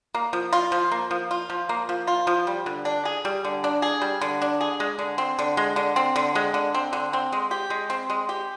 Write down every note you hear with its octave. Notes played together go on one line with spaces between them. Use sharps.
A#3
F3
F4
F3
A#3
F3
F4
F3
A#3
F3
F4
F3
G3
D3
D4
G#4
G3
D3
D4
G#4
G3
D3
D4
G#4
G#3
D3
C4
D3
G#3
D3
C4
D3
G#3
D3
C4
D3
C4
G#3
G4
G#3
C4
G#3
G4